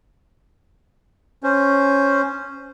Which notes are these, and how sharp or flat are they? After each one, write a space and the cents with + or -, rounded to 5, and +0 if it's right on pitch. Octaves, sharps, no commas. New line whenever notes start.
C#4 +0 C5 +0